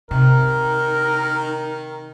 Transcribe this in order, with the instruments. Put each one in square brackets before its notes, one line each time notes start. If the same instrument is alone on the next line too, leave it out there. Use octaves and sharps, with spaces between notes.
[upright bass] C3 [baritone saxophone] D#3 [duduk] D#4 [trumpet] A#4